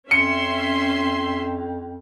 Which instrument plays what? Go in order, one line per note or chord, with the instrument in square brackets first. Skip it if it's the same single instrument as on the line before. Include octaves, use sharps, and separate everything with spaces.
[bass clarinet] F2 [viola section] C#4 E5 C6 [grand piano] C#7